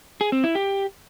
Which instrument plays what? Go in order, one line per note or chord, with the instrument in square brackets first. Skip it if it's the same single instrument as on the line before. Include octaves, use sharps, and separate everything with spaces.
[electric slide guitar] G#4
C4
E4
G4